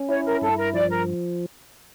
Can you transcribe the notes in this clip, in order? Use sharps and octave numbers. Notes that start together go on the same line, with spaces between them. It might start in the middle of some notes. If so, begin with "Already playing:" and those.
Already playing: C#4
E4 C#5
A#4
G2 A4
A#4
F3 D5
A#4